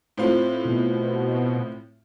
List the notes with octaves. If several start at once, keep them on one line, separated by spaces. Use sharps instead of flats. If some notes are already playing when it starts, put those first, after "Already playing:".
A2 C4 F4
B2